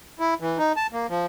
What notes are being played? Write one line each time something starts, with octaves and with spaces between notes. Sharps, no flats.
E4
E3
D#4
A5
A#3
F3